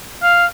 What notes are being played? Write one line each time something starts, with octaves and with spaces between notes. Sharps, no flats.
F5